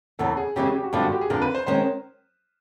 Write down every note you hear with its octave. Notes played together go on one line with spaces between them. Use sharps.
E2 C#3 E3 A4
G#4
C#3 E3 G#3 C#4 G4
G#4
G4
F#4
G2 D3 F3 G#3 B3 F4
F#4
G4
G#4
F2 D3 F3 A#4
B4
C5
D#3 G#3 C#4 C5